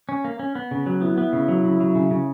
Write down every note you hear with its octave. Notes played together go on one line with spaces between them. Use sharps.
C#4
A#3
C#4
B3
C#3
F#3
B3 E4
B3
C#3
F#3
C#3
F#3
C#3
C#3